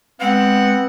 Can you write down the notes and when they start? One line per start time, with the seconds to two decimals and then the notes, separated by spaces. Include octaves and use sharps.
0.21 G#3 B3 C4 F#5